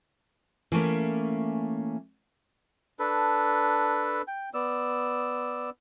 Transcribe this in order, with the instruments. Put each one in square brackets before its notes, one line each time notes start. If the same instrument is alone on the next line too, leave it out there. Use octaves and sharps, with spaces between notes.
[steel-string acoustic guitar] E3 A3 A#3 C#4
[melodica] D4 A4 B4
G5
B3 D5 E6